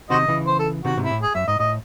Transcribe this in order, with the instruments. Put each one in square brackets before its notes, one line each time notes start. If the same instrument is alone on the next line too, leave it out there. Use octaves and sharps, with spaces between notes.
[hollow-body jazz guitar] C3 D#3 [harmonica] F#4 C5 D#5
[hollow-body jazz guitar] C#3 E3
[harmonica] C5
A4
[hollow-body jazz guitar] C3 D#3 [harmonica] F#4
[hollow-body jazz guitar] G#2 C3
[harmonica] E4
[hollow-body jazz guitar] A2
[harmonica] G#4
[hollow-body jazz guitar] F#2 [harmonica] E5
[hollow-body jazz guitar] G#2 [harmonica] D#5
[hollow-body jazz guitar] A2 [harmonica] D#5